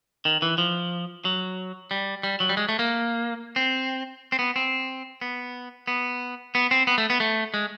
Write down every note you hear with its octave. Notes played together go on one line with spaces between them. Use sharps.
D#3
E3
F3
F#3
G3
G3
F#3
G3
G#3
A3
A#3
C4
C4
B3
C4
B3
B3
B3
C4
B3
A3
B3
A3
G#3